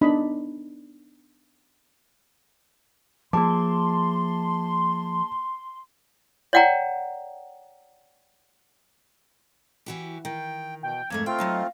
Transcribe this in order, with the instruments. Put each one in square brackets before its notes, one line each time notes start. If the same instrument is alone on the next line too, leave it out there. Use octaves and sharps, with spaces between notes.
[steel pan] B3 D4 D#4 D#5 B5
[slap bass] F3 [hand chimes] A#3 G#4 D6 [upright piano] A5 [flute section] C6
[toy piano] C#5 D5 F#5 G5 A#5
[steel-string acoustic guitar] E3 F#4 G4
[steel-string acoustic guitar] D#3 [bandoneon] G5
[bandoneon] B2 [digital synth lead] G5
[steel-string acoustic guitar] F2 G#2 A3 [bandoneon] A#3 [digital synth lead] G#6
[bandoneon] A3 C4 F4 [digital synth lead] F5 [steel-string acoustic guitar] G5
[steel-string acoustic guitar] F#3 D#4 D#5